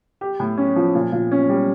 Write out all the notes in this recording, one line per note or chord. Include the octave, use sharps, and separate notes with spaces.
G4
A2
C#4
F3
A#2
A#2
C#4
G3